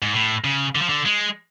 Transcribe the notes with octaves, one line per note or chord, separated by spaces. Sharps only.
G#2
A2
C#3
D3
F3
D3
G#3